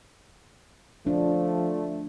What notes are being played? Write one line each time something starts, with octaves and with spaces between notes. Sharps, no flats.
F3 A3 D4